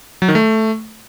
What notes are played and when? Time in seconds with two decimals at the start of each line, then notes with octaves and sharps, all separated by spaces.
0.22 F#3
0.28 D#3
0.35 A3